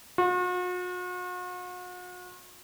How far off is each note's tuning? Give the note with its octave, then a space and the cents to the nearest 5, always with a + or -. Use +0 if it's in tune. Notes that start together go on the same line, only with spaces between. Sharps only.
F#4 -45